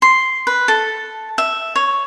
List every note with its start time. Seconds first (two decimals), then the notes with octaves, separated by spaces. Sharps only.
0.02 C6
0.47 B4
0.68 A4
1.38 E5
1.76 C#5